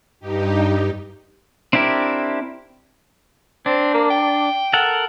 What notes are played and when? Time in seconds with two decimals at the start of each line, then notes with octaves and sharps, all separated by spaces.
0.20 G2 D#4 G4
1.73 C4 D4 E4 G4 A#4
3.66 C4 D4
3.94 A#3
4.10 G5
4.73 A4 A#4 F#5